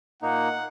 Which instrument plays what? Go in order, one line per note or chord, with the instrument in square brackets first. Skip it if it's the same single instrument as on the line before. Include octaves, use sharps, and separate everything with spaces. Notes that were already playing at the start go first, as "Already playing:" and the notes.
[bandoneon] A#2 A#3 D#4 [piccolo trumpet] F#5